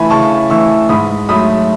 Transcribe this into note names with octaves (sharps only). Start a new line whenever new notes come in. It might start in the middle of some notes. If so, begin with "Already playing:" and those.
Already playing: E3 A3 G#5 B5
C#3 A5 C#6
E3 A3 C#6 E6
G#2 B5 D#6
F#3 A3 B5 D#6